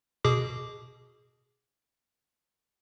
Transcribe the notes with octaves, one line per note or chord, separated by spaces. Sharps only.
B2 G#4 D6